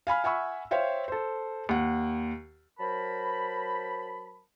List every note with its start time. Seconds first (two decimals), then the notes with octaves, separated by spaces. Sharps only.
0.07 F5 G#5 B5 F6
0.24 E5 F#5 G#5 B5 C#6 E6
0.71 C5 C#5 E5 F5 G5
1.08 A4 C5
1.69 D#2 F#5
2.79 F#3 A#4 C5 A5 B5